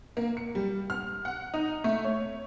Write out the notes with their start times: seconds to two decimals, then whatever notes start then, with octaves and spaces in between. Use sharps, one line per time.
0.17 A#3
0.37 C#7
0.55 G3
0.90 F6
1.25 F#5
1.54 D#4
1.84 A3
2.05 C#5